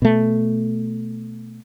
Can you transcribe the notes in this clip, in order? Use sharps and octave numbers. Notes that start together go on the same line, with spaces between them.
B2 A3